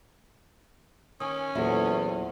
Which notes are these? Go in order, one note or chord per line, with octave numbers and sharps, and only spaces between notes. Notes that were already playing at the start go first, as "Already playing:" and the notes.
D#3 C#4 G#5 C#6 D#6
E2 A#2 F#3 E4 A4 C5 E5